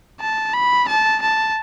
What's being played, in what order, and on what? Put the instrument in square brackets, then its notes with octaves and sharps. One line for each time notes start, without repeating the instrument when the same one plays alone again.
[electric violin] A5
B5
A5
A5